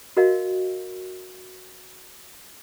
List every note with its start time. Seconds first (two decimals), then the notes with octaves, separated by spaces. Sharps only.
0.17 F#4 A#4 D#5 F5